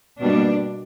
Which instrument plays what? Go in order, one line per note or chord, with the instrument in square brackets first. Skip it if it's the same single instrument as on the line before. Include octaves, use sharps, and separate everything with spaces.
[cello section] B2 G3 A#3 D4